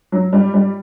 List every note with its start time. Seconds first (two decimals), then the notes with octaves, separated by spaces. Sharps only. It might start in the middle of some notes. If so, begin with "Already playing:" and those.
0.12 F#3
0.33 G3
0.54 G3